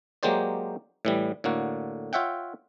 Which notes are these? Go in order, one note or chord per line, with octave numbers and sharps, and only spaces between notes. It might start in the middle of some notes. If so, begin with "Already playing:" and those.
F#3 G#3 A#3 G4 C5 D5
A2 E3 G3
A2 D3 A#3 F#4
F4 C#5 E5 F#5 G5